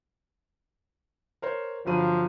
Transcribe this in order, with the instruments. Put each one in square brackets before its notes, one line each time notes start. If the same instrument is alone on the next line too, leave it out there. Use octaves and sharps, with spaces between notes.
[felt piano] A#4 C5 C#5
[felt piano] G1 F#3 D#7 [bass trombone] F3